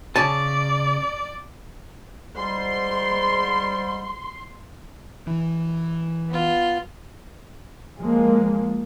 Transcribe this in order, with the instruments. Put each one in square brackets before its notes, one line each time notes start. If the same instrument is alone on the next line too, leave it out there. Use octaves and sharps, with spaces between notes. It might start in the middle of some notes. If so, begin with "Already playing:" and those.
[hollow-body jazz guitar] C#3 G#5 A5 [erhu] D5
[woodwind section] G#2 G3 [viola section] C6
[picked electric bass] E3
[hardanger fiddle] B3 F4
[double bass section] F3 G#3 A#3